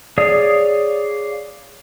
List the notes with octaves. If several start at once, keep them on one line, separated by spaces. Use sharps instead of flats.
G#4 C#5 D5 F5 D#6